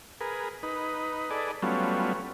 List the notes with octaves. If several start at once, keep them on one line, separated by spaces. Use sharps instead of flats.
G#4 A#4 B4
D#4 B4
G#4 A4 B4 D5 D#5
F#3 G3 A3 B3 C#4 F4